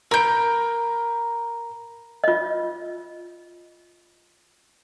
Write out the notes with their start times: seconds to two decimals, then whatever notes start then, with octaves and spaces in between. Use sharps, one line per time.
0.11 A#4 A#5 B5 G6 D7
2.24 F4 D#5